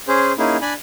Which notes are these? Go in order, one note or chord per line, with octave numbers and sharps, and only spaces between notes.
C#4 G#4 C5
A#3 C#4 D#4 E4 G#4
D4 D5 G#5 B5